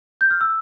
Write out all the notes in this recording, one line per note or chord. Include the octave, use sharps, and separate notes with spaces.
G6
F6
E6